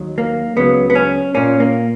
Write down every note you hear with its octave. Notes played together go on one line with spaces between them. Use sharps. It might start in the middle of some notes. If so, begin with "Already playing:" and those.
Already playing: D#2 D#3 F#3
A#3
C#2 C#3 F#3 B3
B3
C#4
A#2 A#3 C#4
A#3